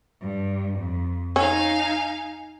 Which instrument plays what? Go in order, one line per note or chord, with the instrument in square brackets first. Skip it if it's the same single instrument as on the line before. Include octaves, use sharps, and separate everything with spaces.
[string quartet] G2
F2
[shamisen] C#4 [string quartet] D#4 F5 G#5